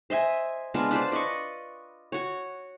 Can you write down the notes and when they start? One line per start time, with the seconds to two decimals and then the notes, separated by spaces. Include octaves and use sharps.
0.10 C5 D#5 E5 G#5
0.74 G#3 B3 D4 F4
0.91 D4 B4 C5 D5
1.12 D5 D#5 B5 C#6
2.12 F#4 C#5